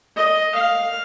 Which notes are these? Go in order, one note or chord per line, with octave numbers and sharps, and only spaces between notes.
D#5
F5